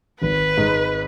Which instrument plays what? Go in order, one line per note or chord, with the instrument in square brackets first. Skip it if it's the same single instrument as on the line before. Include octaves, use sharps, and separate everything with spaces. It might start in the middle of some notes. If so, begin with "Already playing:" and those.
[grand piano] G#1 [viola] B4
[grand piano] G#2